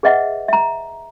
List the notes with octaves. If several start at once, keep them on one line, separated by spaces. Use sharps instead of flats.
G#4 B4 D#5 E5 F#5
E5 A#5